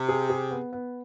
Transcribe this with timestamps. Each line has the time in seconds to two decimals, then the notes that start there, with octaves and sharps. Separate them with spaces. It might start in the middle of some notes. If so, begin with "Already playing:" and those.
Already playing: C3
0.09 G#4
0.30 G#4
0.51 B3
0.73 B3